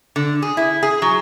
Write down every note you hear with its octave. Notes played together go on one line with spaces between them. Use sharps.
D3
G#4
E4
G#4
F#3